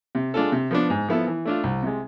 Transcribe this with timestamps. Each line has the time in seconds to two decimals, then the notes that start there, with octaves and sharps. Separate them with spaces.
0.15 C3
0.34 G#3 D4 F4 A4
0.52 C3
0.71 F3 B3 D4
0.90 G#2
1.08 F3 B3 E4 A4
1.27 E3
1.45 A3 D4 F4
1.63 C2
1.82 C3 G#3